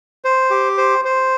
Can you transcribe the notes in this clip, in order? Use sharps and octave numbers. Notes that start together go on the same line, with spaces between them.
C5
G4
C5
C5